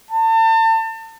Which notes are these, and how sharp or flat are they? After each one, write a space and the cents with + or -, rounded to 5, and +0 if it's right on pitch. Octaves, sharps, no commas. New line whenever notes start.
A5 +35